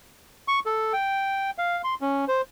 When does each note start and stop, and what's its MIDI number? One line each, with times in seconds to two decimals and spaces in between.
0.48 0.59 85
0.66 0.93 69
0.93 1.50 79
1.58 1.82 77
1.84 1.94 84
2.01 2.25 61
2.28 2.41 72